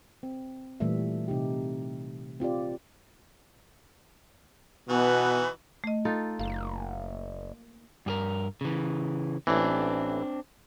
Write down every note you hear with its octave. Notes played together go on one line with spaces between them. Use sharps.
C4
A#2 E3 G3 A3 E5
C3 D#4 G4
C4 F4 G4 D5
B2 E3 B3 D#4 F#4 B4 G#5
A3 D#5
D#4 F4 A4
F#1 A#3
G2 G4 A#4
C#3 E3
A1 E3 C4 D4